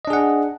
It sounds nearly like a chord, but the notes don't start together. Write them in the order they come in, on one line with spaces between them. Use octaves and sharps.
D#5 D4 G#4 F#5